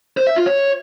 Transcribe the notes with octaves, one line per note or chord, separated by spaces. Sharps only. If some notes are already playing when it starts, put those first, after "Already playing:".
C5
E5
F4
C#5